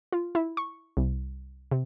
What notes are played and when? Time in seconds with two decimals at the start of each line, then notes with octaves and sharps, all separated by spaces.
0.12 F4
0.35 E4
0.57 C#6
0.97 C2
1.71 C3